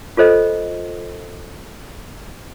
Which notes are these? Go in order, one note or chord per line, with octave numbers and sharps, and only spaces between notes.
F4 A4 C5 D#5